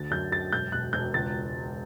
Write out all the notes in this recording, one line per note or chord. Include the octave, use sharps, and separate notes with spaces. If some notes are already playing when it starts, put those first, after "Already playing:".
Already playing: D2 D3 A6
F#2 G6
F#2 A6
E1 G6
E1 F#6
E1 G6
C#2 A6